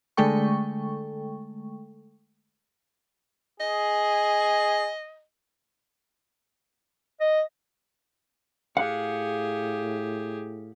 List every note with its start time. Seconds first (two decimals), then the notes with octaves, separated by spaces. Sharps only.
0.17 D3 G#3 A3 A4 G5 C#6
3.60 G#4 D#5
7.20 D#5
8.77 A2 G4 G#4 F5 F#5